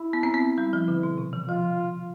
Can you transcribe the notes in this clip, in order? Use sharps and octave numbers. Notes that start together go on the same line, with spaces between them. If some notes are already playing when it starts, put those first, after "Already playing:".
Already playing: E4
B3
C4
B3
G3
F3
D3
B2
C3
E3
F3 F4